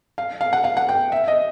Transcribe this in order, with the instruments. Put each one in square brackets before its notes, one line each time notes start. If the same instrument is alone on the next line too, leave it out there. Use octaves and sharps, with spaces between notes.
[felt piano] F5
F5
F#5
F5
F#5
G5
E5
D#5